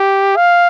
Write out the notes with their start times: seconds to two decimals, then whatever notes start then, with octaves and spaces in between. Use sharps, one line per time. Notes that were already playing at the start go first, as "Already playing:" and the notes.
Already playing: G4
0.36 F5